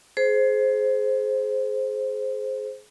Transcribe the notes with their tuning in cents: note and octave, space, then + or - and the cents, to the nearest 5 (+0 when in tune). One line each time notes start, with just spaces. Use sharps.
G#4 +30 C5 +0